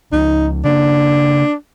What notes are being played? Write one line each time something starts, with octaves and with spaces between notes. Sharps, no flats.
C#2 F3 D#4
C#3 A#3 D4